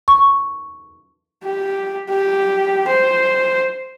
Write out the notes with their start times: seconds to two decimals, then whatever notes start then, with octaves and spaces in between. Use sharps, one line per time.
0.08 C#6
1.44 G4
2.10 G4
2.87 C5